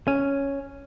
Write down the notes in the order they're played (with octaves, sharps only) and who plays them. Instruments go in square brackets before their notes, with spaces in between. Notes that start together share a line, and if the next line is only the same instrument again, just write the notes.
[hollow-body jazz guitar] C#4